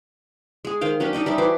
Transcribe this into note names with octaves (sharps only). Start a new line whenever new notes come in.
G#3 G#4
D#3 C5 F5 G5
F#3 C#4 D4 G4
D#4 A4 D#5 G5
G3 D#4 D5 E5
E3 F#4 C5 D6